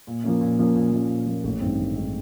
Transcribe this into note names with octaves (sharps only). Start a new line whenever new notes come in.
A#2
F3 A#3 C#4
A#2
F3 A#3 C#4
A#2
F3 A#3 C#4
A#2
F3 A#3 C#4
A1
G2 D#3 G#3 C4
A1
D#3 G#3 C4